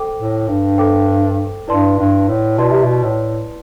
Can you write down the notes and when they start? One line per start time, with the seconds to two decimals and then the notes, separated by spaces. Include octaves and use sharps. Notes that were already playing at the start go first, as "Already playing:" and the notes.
Already playing: A4 C5 G5 D6
0.19 A2
0.48 G2
0.78 A4 C5 G5 D6
1.68 G2 E4 B4 D5 A5 C6
1.98 G2
2.28 A2
2.58 B2 E4 B4 D5 A5 C6
2.70 C3
2.83 B2
3.03 A2